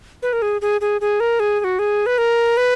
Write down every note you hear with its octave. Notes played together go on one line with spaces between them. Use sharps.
B4
A#4
G#4
G#4
G#4
G#4
A#4
G#4
G#4
F#4
G#4
B4
A#4
B4